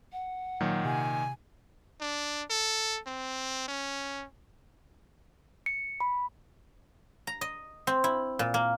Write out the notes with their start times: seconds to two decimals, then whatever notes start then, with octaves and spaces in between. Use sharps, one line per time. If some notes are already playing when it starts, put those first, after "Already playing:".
0.12 F#5
0.61 A#2 D#3 F#3
0.85 C3 G#5
2.01 D4
2.50 A4
3.06 C4
3.68 C#4
5.66 C#7
6.00 B5
7.27 A#5
7.41 D#5
7.87 C4
8.04 E4
8.39 A#2
8.54 A#3